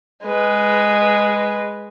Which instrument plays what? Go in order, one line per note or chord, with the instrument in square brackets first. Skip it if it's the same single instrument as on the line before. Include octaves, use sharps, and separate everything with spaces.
[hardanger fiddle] G#3 B4